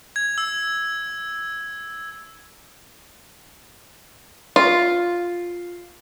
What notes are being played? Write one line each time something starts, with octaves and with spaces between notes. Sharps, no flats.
G#6
E6
F4